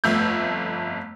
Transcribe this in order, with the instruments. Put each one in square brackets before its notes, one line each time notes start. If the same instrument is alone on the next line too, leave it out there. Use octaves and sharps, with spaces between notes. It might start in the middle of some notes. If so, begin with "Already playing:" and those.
[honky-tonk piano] G1 F2 A3 E6 G6